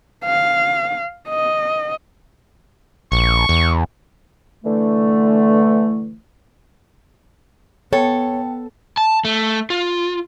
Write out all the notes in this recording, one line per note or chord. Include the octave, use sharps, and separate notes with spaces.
F5
D#5
A#1 C#6
E2
D3 E3 A3
B3 A4 C#5 G5 A5
A5
A3
F4